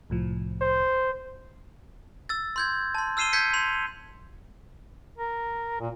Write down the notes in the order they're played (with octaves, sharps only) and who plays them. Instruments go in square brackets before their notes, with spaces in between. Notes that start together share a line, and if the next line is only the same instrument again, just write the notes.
[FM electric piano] C2 A2 F3
[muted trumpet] C5
[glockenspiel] E6 A6
C6 G6 G#6
A5 C6
E6 F6 C7 D#7 E7 G7
G6 G#6 B6 C#7
C6 F7
[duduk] A#4
A#2